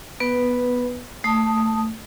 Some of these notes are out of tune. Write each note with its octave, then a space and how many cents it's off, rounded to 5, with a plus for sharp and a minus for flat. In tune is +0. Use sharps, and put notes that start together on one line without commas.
B3 -5 B4 +0
A3 +20 A5 +0 D#6 +0